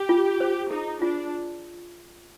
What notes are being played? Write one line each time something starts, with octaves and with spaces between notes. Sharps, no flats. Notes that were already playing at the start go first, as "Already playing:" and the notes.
Already playing: G4
F4
C5
D#4 G#4
D4 F4